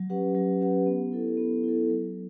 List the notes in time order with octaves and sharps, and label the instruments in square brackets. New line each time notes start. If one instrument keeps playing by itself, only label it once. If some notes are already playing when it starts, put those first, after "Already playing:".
Already playing: [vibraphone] F#3
C#4 G4 B4 F#5
F#3
C#4 G4 B4 F#5
B3
E4 A4
B3
E4
A4
F#3